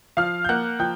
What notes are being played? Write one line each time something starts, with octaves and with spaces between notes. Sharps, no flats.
F3 F5 F6
G6
A#3 F#5 F#6
F3 G5 G6